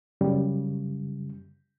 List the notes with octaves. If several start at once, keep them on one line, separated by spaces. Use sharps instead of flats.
F#2 C#3 G3